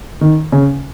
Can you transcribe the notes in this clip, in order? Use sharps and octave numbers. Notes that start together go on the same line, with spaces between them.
D#3
C#3